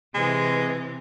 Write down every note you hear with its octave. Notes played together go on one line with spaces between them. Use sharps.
C3 E3 G#3